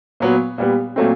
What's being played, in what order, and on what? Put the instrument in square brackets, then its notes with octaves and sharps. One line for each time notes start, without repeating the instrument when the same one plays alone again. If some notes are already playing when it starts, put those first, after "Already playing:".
[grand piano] A#2 F#3 B3
A#2 G3 B3
A#2 F#3 A3 C4